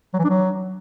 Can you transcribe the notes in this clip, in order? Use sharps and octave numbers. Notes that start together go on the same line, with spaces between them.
F#3
E3
D4
F#3